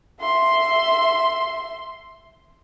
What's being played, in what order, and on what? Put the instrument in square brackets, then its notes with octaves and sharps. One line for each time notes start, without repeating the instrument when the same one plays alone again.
[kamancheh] E5 C6